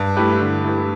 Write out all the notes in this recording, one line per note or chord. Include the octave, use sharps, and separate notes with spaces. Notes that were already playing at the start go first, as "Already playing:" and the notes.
Already playing: G2
A3 E4 G4 B4
D3
A3 E4 G4 B4